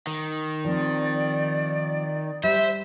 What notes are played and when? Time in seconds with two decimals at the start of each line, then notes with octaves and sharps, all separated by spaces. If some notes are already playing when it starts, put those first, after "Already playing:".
0.07 D#3
0.65 F3 C4 D5
2.43 G3 C5 E5